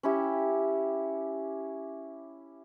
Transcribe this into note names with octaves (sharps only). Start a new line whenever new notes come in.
C#4 E4 G4